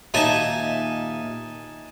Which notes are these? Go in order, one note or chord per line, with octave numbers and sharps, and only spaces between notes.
D#2 A#2 D#4 E5 G#5 A5